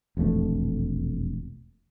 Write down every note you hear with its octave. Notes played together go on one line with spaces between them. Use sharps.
E1 A#1 F2 A3